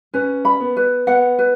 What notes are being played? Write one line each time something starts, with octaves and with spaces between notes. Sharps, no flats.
C#4 B4
B5
B3
B4
B3 F#5
B4